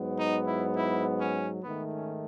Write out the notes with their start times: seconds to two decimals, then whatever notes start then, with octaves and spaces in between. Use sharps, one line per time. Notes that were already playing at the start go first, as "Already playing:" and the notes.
Already playing: G#2 F#3 B3
0.18 D#4
0.47 E4
0.75 E4
1.19 C#4
1.62 G#2 D#3 A3 B3
1.92 C#4